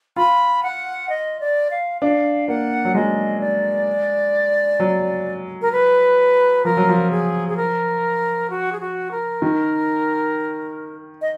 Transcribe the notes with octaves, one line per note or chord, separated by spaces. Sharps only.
F4 B5
F#5
D#5
D5
F5
D4 F5
A#3 F#5
F#3
G#3 D#5
D5
F#3
A#4
B4
F3 A#4
F#3
F3
G#4
G#4
A#4
F#4
G#4
F#4
A#4
D#3
D#5